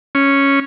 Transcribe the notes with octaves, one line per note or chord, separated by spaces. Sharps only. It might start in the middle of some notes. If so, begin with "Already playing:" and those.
C#4